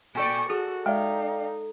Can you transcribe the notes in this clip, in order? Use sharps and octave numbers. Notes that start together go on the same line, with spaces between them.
A#2 A4 D5 G5 C#6
F#4 G#4 A4
G#3 D#4 D5 F5 G5